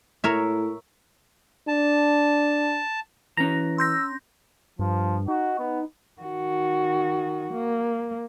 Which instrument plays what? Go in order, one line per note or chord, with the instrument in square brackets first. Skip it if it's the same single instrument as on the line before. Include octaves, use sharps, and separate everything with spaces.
[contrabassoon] A2 [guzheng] A#4 C#5 E5
[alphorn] D4 [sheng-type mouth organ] A5
[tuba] E3 [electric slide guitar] C#4 A#5 [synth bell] A#6
[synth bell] C6 G6 A#6 [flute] E6
[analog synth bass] G2 [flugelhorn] F3
[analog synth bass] D#4 [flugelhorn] F#4
[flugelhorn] B3
[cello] D#3 F#4
A#3